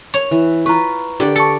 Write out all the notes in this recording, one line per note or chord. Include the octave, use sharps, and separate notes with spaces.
C#5 F7
E3
F4 B4 A#5 C#6
D3 G4 D5
A4 C#6 C#7